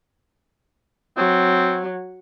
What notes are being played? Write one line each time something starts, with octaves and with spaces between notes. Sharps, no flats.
F#3 C4